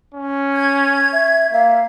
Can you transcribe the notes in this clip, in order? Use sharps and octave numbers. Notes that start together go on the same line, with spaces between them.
C#4
G#6
E5
A#3 E5 F5